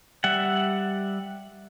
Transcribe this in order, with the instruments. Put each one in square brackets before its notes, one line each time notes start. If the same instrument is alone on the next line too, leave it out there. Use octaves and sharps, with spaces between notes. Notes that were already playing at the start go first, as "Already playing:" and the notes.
[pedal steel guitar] G3 E5 F#5